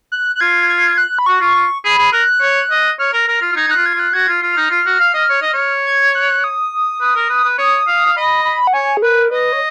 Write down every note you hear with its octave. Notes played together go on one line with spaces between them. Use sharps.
F#6
F#6
F4 G#6
G#6
F#6
B5
F#4 C#6
F4
F4
G#4 B5
G#4
A#4 F#6
C#5
D#5
C#5 F6
A#4
A#4 F6
F4
F4
D#4 G#6
D#4
F#6
F4
G#6
F4
F#6
F#4 G#6
F4
F4
D#4 F6
F4
F#4
F5
D#5
C#5
D#5
C#5
G#6
F#6
D#6
B4
A#4
B4
B4
C#5 D#6
F5
F5
D#5 B5
B5
F#5
C#5 G#5
G#4
A#4 B4
B4 D#5
C#5